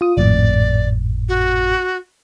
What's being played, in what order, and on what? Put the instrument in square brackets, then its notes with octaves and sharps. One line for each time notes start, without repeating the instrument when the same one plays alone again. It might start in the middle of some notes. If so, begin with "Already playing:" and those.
[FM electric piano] F4 D#6
[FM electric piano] G#1 F2 A2 [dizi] D5
[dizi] F#4